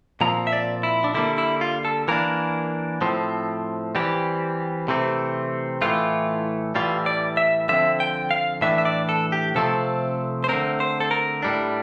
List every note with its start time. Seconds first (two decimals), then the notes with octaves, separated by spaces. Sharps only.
0.21 A#2 F3 C4 A#5
0.47 E5
0.53 D5
0.83 E4
1.04 D4
1.14 D3 G3 A#3 E4
1.38 E4
1.61 F4
1.85 A4
2.08 E3 A#3 D4 A#4
3.01 A2 F3 C4
3.95 E3 G3 C4 G4
4.88 C3 E3 A3 C4
5.82 A2 E3 A3 F4
6.75 A2 E3 G3 F4
7.06 D5
7.37 E5
7.69 D3 F3 C4 E5
8.00 G5
8.31 F5
8.61 A2 E3 A3 D4 E5
8.78 E5
8.85 D5
9.09 A4
9.32 G4
9.55 C3 F3 A3 C4 A4
10.44 C5
10.49 D3 A3 C4 A#4
10.80 C5
11.00 A4
11.11 A#4
11.42 A2 G3 D4